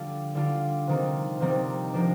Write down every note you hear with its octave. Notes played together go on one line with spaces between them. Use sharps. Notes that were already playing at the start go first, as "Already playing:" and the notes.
Already playing: D3 G3 D4 F4
D3 G3 D4 F4
C3 D#3 G3 C4
C3 D#3 G3 C4
C3 F3 A#3 D4